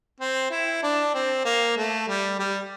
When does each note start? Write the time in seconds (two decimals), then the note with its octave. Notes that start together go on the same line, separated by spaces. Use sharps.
0.20 C4
0.50 E4
0.83 D4
1.14 C4
1.45 A#3
1.77 A3
2.08 G3
2.39 G3